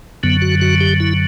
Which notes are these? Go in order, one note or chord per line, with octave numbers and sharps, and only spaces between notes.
F#2 D3 F#3 B3
F#4
F#4
G4
E4